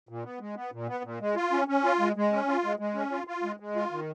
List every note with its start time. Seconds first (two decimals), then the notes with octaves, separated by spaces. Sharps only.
0.09 A#2
0.24 B3
0.40 G#3
0.56 B3
0.73 A#2
0.88 B3
1.04 A#2
1.21 G#3
1.36 F4
1.52 C#4
1.68 C#4
1.84 F4
2.00 G#3
2.16 G#3
2.32 C#4
2.48 F4
2.64 G#3
2.79 G#3
2.95 C#4
3.12 F4
3.27 F4
3.44 G#3
3.60 G#3
3.76 F4
3.91 D#3